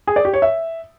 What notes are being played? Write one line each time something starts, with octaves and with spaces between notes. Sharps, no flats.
G#4
D5
G4
C#5
E5